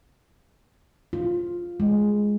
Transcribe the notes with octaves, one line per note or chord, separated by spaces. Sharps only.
F4
G#3